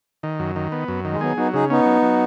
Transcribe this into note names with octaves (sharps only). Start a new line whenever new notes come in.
D#3
F#2
D#3
B3
F#2
D#3
G#3
F#3 B3 G#4
F#3 B3 D#4
C#3 D#4 G#4
B3 C#4 D#4
F#3
F#3